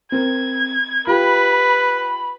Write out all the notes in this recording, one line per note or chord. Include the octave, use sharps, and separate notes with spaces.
C4 A#4 G#6
F4 G4 B4 B5